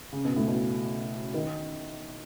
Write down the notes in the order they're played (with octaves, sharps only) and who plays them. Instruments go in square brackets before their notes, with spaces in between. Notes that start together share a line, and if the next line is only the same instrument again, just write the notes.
[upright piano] C#3
B2
A2
B2
D#3